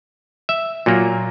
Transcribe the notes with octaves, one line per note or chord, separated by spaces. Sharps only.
E5
A#2 F#3 A#3